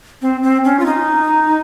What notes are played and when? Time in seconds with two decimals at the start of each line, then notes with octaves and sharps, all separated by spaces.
0.22 C4
0.43 C4
0.65 C#4
0.80 F4
0.86 D#4